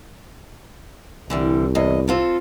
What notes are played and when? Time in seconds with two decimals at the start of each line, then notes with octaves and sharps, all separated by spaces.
1.30 C2 D3 E3 G3
1.75 E2 D#5
2.08 C4 F4 A4